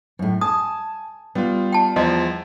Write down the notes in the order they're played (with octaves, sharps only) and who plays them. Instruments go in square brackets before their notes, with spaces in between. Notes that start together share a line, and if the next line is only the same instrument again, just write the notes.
[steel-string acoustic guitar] F#2 A2
[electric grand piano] G#5 [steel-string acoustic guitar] A5 [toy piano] D#6
[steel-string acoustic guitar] G3 [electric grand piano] B3 F4
[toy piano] G5 A5
[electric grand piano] E2 F3 C6 [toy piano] D#5